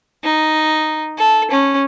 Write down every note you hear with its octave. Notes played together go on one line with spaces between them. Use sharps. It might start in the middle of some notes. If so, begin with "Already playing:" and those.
D#4
A4
C#4